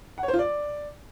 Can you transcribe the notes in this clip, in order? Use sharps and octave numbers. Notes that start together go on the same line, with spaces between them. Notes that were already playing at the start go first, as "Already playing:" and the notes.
F#5
C#5
C5
F4
D5